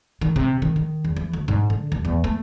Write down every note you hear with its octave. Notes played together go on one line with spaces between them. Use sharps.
D#3
C3
D#3
D#3
E2
E3
D2
G#2
D3
D#2
E2
A3